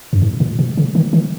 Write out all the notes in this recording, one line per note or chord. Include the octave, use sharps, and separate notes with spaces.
F#2
G#2
A#2
B2
C#3
D#3
D#3